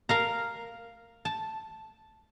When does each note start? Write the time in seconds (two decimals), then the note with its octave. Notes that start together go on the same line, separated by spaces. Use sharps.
0.09 A#4 F5 A#5
1.25 A5